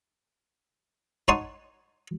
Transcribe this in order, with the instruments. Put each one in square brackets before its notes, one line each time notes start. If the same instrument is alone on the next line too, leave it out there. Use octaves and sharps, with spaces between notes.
[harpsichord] D#4 C#5 F#5 A5 C6 D#6